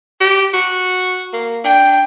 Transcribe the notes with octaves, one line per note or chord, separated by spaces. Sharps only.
G4
F#4
A#3
D4 G5